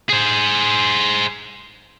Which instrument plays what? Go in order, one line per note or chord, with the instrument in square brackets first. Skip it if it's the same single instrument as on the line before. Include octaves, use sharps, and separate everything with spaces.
[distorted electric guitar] G#4 C5